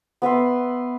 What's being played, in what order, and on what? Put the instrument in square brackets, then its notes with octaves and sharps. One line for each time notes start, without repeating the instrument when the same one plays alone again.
[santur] B3 B4 E5 C6